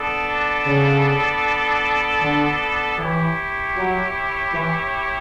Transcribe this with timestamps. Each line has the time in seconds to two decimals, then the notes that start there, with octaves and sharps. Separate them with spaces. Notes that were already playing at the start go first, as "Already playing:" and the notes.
Already playing: B3 D4 A4
0.67 C#3
2.22 D3
2.99 E3 E4 G4 C#5
3.76 F#3
4.54 E3